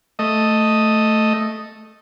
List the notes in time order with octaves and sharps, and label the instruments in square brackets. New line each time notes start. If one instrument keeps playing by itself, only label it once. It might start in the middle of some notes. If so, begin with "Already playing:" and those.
[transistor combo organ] A3 D#5